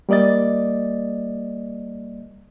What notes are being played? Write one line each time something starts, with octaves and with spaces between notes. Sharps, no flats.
G3 A#3 D5 D#5 A6